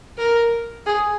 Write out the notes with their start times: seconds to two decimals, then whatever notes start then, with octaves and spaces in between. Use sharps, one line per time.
0.18 A#4
0.86 G#4